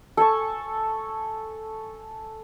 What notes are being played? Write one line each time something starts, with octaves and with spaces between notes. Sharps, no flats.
A4 G#5 A5 C#6